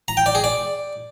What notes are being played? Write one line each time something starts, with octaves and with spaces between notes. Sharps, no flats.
A#5
G5
D5
G#4
D5